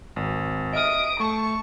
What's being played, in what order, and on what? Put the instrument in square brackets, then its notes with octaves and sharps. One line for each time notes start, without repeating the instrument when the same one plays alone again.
[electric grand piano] G#1
[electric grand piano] D#5 E5 F6 [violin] D#6 D7
[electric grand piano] A3 [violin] A5 [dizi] C#6